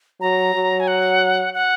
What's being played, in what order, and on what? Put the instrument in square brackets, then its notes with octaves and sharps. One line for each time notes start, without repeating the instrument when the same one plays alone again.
[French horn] F#3 [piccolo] A#5
[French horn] F#3
[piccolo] G#5
F#5
F#5